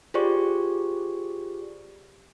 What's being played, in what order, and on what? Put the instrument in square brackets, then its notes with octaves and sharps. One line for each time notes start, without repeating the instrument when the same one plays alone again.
[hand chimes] F4 G4 G#4 C5 D5 C#6